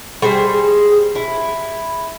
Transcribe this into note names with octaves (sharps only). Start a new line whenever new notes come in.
G3 G#4 C5
E4